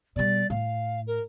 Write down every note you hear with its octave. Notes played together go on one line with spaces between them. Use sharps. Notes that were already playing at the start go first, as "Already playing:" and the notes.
B2 G3 D5
A2 F5
A#4